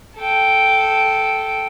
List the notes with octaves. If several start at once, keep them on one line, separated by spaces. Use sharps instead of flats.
A4 G5